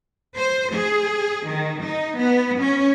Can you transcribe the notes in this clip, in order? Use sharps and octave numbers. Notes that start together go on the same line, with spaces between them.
C5
G#4
D#3
D#4
B3
C#4